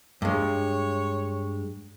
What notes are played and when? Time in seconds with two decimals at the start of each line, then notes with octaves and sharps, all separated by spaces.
0.22 G2 G#3 C#5